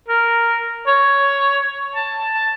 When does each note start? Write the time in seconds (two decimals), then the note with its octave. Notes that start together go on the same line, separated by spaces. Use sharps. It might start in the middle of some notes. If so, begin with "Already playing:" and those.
0.08 A#4
0.87 C#5
1.95 A5
2.33 A5